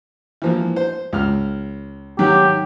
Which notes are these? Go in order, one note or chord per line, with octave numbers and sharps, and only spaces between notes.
E3 F3 A#3
C5
C#2 F6
G#2 D#3 F#3 G4